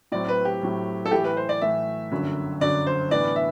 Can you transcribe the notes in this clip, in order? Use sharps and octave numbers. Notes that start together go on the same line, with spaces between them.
A2 F#3 C4 D5
B4
G4
A2 F#3 C4
A4
A2 E3 A3 G4
B4
C5
D5
A2 E3 A3 E5
G1 F#2 D3 F#3
G1 F#2 D3 F#3 D5
C5
A2 E3 B3 D4 D5
E5